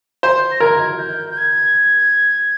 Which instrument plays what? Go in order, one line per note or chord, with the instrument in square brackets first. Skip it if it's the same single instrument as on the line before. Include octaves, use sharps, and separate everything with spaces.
[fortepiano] C5
[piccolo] A#6
[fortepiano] A#4 [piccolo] G#6
[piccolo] G6
G6
G#6